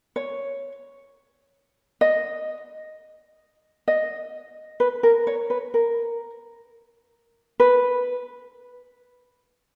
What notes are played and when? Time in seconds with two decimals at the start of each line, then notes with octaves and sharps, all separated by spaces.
0.16 C#5
2.01 D#5
3.88 D#5
4.80 B4
5.03 A#4
5.27 C#5
5.50 B4
5.74 A#4
7.60 B4